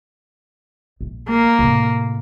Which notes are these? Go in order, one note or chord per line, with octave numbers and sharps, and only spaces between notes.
A#1
A#3
A2 C3